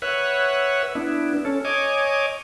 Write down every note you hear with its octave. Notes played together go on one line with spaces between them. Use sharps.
B4 C#5 E5 F#5
B3 D4 E4
C#4 A4
C#5 D#5 G#5 D6